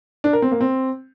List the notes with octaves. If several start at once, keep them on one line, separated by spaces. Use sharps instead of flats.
D4
A#4
C4
A#3
C4